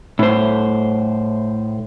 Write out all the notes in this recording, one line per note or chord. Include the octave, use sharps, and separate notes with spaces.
A2 C5